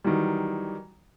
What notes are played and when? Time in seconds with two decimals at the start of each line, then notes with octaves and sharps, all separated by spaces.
0.04 D#3 E3 F#3 G3